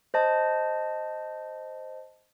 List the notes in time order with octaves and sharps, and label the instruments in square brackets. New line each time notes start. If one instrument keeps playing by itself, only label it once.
[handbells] C5 D#5 A5